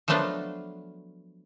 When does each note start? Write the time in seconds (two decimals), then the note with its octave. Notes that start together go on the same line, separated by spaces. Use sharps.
0.08 F3 F#3 A3 B3 D4 F4